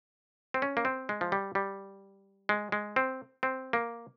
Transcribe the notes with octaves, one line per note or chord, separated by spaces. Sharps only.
C4
C#4
A#3
C4
G#3
F3
G3
G3
G#3
G#3
C4
C4
A#3